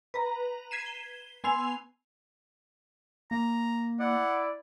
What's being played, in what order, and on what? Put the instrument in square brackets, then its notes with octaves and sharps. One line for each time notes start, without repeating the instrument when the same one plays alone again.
[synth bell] B4 A#5
G#6 B6 C7 D#7 E7
G7
B3 G#5 C6 E6 C7 F7
[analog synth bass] A#3 [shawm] A#5
[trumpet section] E4 D5 [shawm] F#5